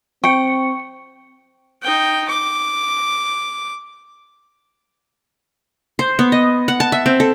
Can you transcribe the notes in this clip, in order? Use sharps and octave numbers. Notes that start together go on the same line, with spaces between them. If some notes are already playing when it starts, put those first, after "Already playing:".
C4 G5 C#6 C#7
D#4 G5
D6
C5
B3
D#5
F#5
A5
E5
C4
A4